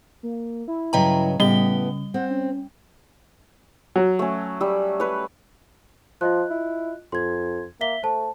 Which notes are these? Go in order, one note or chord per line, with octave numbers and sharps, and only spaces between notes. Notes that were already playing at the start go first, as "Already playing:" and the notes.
A#3
E4
G2 C#3 F#3 D#5 G5 A#5
A2 C#3 G3 B3 G4 G7
C4 F#5
C#4
F#3
A3 C#4
G3 E6
B4 C#5
F3 F4 D#5 F#6
E4
F2 C6 G#6
A#3 E5 B6 G7
A3 C5 A5